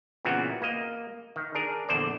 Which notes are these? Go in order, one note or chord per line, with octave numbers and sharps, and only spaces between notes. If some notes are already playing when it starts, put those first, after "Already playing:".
A#2 C#3 E3 B3 C4 F#4
A#3 D#5
D#3
D4 G#4 A#4
A#1 E2 D3 C5 D5